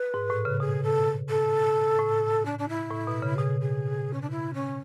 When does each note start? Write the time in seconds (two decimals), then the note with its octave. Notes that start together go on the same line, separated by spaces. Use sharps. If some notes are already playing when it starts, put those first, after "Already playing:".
Already playing: B4
0.14 G#2
0.30 A2
0.45 C#3
0.60 B2 G#4
0.83 A4
1.29 A4
1.99 A2
2.45 D4
2.59 D4
2.68 E4
2.91 A2
3.08 B2
3.22 C#3
3.37 B2 G#4
3.61 G#4
4.13 C#4
4.21 D4
4.30 E4
4.54 C#4